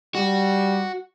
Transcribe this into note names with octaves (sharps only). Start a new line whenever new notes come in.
G3 F#4